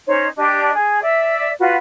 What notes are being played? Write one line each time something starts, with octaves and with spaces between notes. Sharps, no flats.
C#4 D#4 C5 C#5
D4 G4 D#5
G#4
D5 E5
F4 F#4 B4